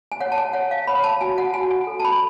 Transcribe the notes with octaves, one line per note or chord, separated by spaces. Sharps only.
G#5
C#5 F#5
A5
G#5
C#5 F#5
F5
C#5 B5
A5
F#4 G#5
F#5
F#4 G#5
G#5
A4
A5
B5